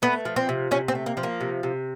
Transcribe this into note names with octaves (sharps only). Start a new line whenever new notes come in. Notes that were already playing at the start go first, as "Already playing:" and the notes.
A3 B3
F3
C4
C3
C3 C#4
C4
A3
A#3
F3
A#3
C3
C3